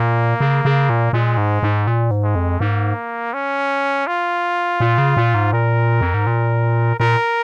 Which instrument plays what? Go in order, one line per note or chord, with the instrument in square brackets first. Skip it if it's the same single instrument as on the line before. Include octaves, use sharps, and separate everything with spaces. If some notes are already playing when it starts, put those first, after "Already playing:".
Already playing: [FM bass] A#2 [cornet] A#3
[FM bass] C#3
C#3
A#2
[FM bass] A#2 [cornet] G#3
[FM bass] G#2
G#2
A#2
G#2
[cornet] G#3
[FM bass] F2
[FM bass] G#2 [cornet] A#3
[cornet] C#4
F4
[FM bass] A#2
C#3
A#2
G#2
[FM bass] A#2 [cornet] A#4
[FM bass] F2
G#2
A#2
[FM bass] A#2 [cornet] A#4